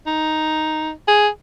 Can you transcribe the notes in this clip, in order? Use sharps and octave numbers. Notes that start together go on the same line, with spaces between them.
D#4
G#4